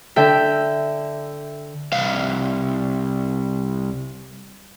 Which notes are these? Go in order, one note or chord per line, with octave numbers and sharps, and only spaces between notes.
D3 A4 E5 G5
C2 F5